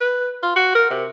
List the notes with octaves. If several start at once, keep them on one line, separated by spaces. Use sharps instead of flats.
B4
F4
F#4
A#4
C3